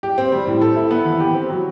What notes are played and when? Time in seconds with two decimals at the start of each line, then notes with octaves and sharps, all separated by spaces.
0.03 G4
0.18 C4
0.32 G3
0.47 A2
0.61 A4
0.76 E4
0.91 B3
1.05 E3
1.20 G4
1.34 C4
1.50 F#3